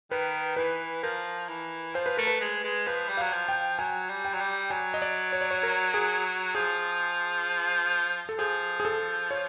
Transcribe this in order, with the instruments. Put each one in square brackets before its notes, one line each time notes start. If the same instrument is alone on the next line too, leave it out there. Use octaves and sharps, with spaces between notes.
[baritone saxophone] D#3 [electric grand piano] B4
[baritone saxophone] E3 [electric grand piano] B4
[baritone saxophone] F3 [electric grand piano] A#4
[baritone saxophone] E3
[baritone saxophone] F3 [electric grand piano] C5
[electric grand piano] B4
[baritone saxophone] A3 [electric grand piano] A#4
[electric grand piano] B4
[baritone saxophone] G#3
G#3
[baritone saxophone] F3 [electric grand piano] B4
[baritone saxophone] G3
[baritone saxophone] F#3 [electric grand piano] F5
[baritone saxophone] F3
[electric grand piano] G5
[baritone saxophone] F#3 [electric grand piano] G#5
[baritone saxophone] G3
[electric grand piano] G5
[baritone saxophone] F#3
G3
[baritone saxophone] F#3 [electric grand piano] G#5
[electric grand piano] D#5
D5
C#5
D5
C#5
A#4
G#4
[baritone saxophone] F3 [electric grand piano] G#4
[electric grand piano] A4
[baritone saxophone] F3 [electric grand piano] G#4
[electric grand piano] G#4
A4
C#5